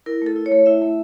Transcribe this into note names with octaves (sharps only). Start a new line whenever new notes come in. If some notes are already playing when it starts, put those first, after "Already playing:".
E4 A#4
A3 A4
E4
C#5
A3
E4 E5
A3